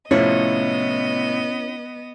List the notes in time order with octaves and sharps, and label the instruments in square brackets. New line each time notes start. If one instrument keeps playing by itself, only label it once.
[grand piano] A2 C3 F3 [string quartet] B3 D#5 [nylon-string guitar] C#4 E4 C#5